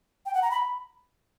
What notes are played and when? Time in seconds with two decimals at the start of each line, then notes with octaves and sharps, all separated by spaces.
0.26 G5
0.34 F#5
0.42 A#5
0.51 B5